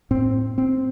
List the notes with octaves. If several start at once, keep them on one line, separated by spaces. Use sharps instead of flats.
A2 C4
C4